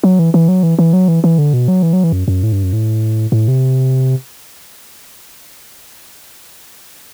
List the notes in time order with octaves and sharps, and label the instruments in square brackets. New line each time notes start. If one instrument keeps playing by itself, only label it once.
[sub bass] F#3
E3
E3
F#3
E3
E3
F#3
E3
E3
D3
B2
F#3
E3
F#3
E3
F#2
F#2
A2
G2
F#2
A2
A2
C3